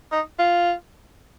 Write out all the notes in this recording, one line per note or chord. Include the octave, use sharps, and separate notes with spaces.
D#4
F4